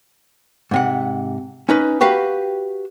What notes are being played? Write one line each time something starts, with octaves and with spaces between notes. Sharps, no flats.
G#2 C3 F#5
C#4 D#4 B4
F#4 G4 B4 F5